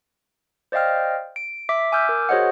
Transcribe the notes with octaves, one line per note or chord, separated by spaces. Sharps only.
C5 D5 D#5 F5 G5 F6
D7
E5 D6 B6
G#5 D6 E6 F6 G6
A#4
F#4 G#4 C5 C#5 D#5 F#5